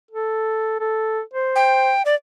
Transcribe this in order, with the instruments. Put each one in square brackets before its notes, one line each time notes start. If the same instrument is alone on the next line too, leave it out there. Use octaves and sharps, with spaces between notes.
[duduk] A4
A4
C5
[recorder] G5
D5